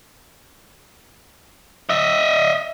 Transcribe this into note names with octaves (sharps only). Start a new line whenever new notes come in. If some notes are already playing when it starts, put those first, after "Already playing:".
D#5 E5